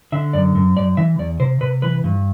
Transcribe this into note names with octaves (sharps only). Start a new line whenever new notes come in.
D3 E5
F#2 D5
F#2
F#2 D5
E3 E5
E2 D5
C3 C5
C3 B4
E3 B4
G2